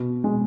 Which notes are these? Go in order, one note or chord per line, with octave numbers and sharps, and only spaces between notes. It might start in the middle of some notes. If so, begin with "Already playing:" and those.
Already playing: B2
G#3